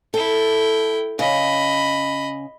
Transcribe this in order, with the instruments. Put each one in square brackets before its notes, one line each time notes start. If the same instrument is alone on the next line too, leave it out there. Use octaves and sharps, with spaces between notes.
[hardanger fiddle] E4 G5 [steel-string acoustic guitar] A4
[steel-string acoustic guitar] C#3 [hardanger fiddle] D#5 B5